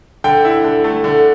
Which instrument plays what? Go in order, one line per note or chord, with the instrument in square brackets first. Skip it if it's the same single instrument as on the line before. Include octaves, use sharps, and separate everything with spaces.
[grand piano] D3 G5
E4
D3
A3
D3